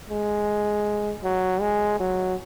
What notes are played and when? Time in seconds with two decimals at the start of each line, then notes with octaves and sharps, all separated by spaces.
0.10 G#3
1.24 F#3
1.61 G#3
2.00 F#3